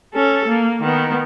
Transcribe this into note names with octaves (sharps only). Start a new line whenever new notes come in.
C#4 A4
A#3
D#3 B3